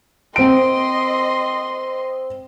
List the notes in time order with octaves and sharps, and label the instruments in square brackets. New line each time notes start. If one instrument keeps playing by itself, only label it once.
[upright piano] C4 D7 [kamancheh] D#5 C6